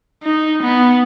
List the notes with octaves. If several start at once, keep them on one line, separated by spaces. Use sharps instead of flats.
D#4
B3